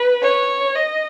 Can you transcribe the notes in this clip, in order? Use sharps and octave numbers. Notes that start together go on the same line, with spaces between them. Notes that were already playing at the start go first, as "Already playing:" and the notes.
Already playing: B4
C#5
D#5